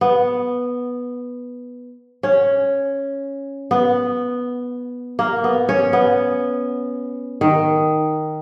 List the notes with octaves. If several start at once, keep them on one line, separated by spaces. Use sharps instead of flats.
B3
C#4
B3
A#3
B3
C#4
B3
D#3